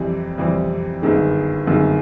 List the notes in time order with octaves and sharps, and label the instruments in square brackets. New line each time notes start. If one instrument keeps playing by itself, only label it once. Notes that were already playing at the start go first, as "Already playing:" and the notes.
Already playing: [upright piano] F2 C3 E3 G3 C4
F2 C3 E3 G3 C4
G1 F#2 D#3 G#3
G1 F#2 D#3 G#3